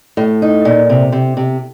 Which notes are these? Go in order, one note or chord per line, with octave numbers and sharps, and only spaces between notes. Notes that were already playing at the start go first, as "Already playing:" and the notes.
A2
D#4
A#2
C3
C3
C3